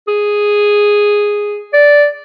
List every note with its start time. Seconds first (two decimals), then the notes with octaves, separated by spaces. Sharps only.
0.08 G#4
1.73 D5